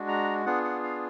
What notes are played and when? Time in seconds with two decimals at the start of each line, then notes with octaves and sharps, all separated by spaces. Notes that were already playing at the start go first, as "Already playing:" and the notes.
Already playing: G#3 D4 F#4
0.09 A#5
0.46 B3 D4 F4 G#4 F#5
0.64 F#5
0.83 F5